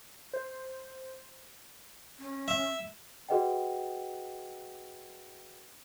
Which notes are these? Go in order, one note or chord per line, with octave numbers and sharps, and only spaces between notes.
C5
C#4
E5
F#4 G#4 B4 D#5 F#5 G5